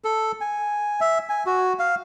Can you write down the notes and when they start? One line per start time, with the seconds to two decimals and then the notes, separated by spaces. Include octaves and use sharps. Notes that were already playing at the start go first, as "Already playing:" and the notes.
0.04 A4
0.41 G#5
1.01 E5
1.29 G#5
1.46 F#4
1.79 F5